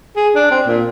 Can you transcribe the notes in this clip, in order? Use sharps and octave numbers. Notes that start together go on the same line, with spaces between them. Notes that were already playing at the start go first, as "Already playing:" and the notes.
G#4
D4
C4
A#2